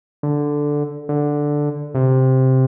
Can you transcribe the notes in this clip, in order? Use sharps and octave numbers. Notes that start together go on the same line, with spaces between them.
D3
D3
C3